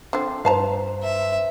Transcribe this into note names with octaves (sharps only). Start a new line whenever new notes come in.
D3 F3 C4
G2 B4 C5 F5 A5 A#5
E5